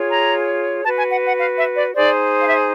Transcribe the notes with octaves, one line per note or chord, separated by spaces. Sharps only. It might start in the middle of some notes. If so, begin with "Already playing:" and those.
Already playing: F4 G#4 C#5
A#5
F#4 B4 A5
G#5
F#5
F#5
F5
E5
D5
D#4 G#4 C5 D5
F5
E5